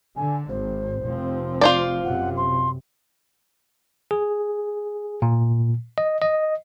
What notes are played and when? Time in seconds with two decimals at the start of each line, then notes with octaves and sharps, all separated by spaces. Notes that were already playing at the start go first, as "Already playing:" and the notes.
0.16 D3 G#5
0.49 G#1 C5
1.03 F1 F3 C4
1.61 F4 C5 D5
2.04 F#2 C3 F#5
2.37 C6
4.11 G#4
5.22 A#2
5.98 D#5
6.22 D#5